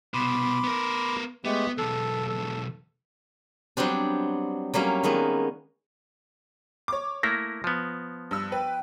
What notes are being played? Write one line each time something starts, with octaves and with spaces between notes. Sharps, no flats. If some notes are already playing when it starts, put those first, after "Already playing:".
C2 B2 B5 C6 D6
B3 A#4
G#3 A3 B3 G4
B1 E2 A4
A4
F#3 G3 B3 C4 D4
F#3 G3 A#3 C#4
D#3 G#3 A#3 B3
C#5 D6
A3 A#3 E4 A#6
F3 B3
G2 E6
B4 G5